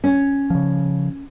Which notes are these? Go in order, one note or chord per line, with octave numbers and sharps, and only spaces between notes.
C#4
C#3 F3